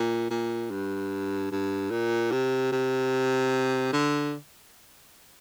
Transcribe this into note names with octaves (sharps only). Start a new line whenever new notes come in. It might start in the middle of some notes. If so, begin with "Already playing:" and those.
Already playing: A#2
A#2
G2
G2
A#2
C3
C3
D3